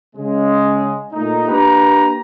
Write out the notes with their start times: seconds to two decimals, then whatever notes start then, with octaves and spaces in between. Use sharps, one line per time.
0.16 C#3 G#3
1.13 A#2 A3 D#4
1.48 A#3 D4 G4 B4 A#5